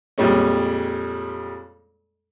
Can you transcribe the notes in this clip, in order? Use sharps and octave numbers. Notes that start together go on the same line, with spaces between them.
F2 A#2 G3 G#3 C#4